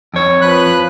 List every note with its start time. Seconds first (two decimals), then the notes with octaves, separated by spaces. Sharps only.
0.14 F2 C#5
0.41 F3 B4 F#6